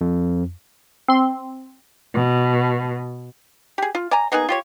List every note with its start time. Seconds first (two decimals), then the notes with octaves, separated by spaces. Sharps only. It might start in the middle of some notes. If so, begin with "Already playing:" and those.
0.01 F2
1.08 C4 C6
2.13 B2
3.78 G4 G#4
3.95 F4
4.11 D5 G#5 A#5
4.32 A#3 B3 D#4 G#4
4.49 F4 G4 C#5